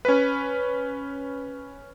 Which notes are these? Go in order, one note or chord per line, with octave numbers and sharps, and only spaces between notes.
C#4 B4